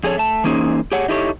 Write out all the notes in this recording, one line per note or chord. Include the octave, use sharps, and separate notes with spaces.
F2 G#4 A4 C#5
A3 A5
E3 A#3 C#4 D#4 G#4 C5
G4 G#4 C#5 F#5
D#4 E4 G4 A4 B4 C#5